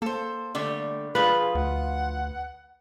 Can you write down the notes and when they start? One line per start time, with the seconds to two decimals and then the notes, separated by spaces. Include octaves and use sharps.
0.02 A#3 A4 C5
0.55 D3 G3 A3
1.15 F3 F4 G#4 B4
1.55 D2 F#5